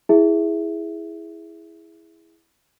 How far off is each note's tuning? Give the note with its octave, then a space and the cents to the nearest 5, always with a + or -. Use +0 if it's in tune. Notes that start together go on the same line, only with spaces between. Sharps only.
E4 +0 G#4 +0 E5 +5